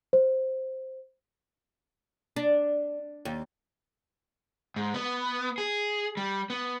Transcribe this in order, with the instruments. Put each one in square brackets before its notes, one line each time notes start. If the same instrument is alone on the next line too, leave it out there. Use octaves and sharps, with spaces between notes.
[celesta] C5
[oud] D4
D#2
[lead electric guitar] G#2
B3
G#4
G3
B3